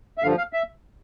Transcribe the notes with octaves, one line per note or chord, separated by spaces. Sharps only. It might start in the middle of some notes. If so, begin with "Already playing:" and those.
E5
G2 D3 F3 F5
F5
E5